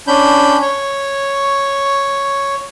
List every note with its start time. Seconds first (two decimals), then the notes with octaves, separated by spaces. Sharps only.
0.07 C#4 D4 B5 G6
0.61 C#5